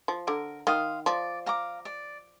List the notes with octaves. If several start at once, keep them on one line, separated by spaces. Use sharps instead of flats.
F3
D3 A#4
D#3 F5 C6 D#6
F3 D5
F5 A#5 D6
D5